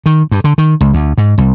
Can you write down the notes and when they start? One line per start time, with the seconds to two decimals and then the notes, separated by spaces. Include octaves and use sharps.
0.06 D#3
0.31 G2
0.44 D3
0.58 D#3
0.81 C#2
0.94 D2
1.18 G#2
1.38 C2